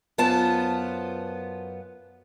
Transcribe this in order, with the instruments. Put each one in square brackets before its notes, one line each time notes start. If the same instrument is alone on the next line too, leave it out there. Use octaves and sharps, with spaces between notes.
[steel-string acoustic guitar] F#2 B3 F4 C5 A5